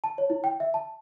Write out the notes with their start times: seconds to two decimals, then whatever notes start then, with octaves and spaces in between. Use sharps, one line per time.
0.04 A5
0.18 C#5
0.30 E4
0.44 G5
0.60 E5
0.74 A5